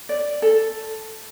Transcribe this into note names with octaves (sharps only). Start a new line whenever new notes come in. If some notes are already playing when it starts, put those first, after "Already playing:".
D5
A4